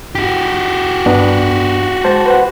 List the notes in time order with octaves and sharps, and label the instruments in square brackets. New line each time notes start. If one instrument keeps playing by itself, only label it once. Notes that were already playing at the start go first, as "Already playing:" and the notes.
[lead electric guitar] F#4 G4
[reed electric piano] G2 B3 D4
G#3 C5 A5
B4 C5 F#5